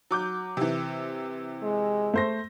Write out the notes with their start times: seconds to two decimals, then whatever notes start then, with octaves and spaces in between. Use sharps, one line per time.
0.11 F#3 D6 G6
0.57 C3 E3
1.63 G#3
2.14 A3 C5 A#6